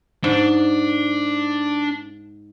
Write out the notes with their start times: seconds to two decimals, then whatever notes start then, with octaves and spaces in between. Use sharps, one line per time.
0.24 G#2 D4